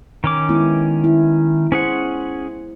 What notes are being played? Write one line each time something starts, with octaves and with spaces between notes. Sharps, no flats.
D#3 C#4 D6
G#3 B3 E4
E4
C#4 G#4 C5 F#5